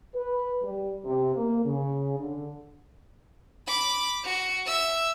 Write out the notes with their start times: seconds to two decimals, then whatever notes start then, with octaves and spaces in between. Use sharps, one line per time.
0.15 B4
0.63 G3
1.05 C3
1.36 A#3
1.65 C#3
2.19 D3
3.67 B5 D6
4.24 F#4 C#7
4.66 E5 E6